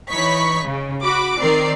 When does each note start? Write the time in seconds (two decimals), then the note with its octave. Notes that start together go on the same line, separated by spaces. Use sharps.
0.10 E3 D#4 C#5 B5 C#6 B6
0.65 C#3
1.03 F#4 B5 D6
1.40 D#3 C4 A#4 D5 C7